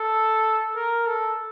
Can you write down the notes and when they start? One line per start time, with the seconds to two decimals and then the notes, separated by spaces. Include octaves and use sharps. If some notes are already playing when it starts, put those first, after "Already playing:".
Already playing: A4
0.75 A#4
1.06 A4